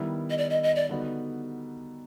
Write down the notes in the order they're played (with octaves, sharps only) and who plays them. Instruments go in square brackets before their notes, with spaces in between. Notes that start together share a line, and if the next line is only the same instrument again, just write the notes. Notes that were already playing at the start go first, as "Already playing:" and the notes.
Already playing: [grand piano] D#3 G3 B3 E4
[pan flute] D#5
D5
D#5
D#5
D5
[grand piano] D3 G3 B3 D#4 F#4